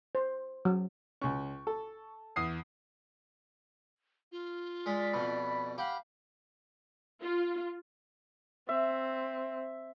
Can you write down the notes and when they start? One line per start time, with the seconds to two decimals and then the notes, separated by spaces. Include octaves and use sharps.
0.15 C5
0.65 F#3
1.21 C#2 C#4 C#6
1.67 A4
2.36 E2 D#6 C7
4.32 F4
4.86 G#3 D5 B6
5.14 F2 B2 B5
5.78 G4 F5 F#5 B5
7.23 F4
8.69 C4 E5